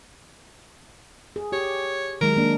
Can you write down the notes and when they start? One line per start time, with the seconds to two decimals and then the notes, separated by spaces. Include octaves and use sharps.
1.36 G#4
1.52 G4 C#5
2.21 D#3 F#3 G#3 A#4
2.37 A#3 D4